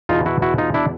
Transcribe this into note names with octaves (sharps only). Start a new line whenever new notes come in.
E2 B2 D#4 F4
E4 F#4
E4 F#4
D#4 F4
D4 E4